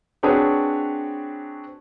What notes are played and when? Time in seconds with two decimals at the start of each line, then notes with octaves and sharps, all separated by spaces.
0.23 C4 D4 F#4 G#4 B4 C#5